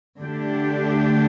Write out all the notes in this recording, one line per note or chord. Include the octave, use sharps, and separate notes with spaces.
D3 A3 D4 G4